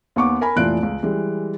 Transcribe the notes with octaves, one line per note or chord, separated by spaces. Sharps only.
D#2 B3 C#6 D6
A#4 G#5 B5
F1 A#2 E3 F4 F#6 D7
C#2
E3 G3 G#3